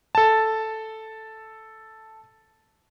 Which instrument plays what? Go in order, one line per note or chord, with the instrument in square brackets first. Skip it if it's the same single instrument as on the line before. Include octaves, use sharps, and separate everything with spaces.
[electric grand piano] A4 A5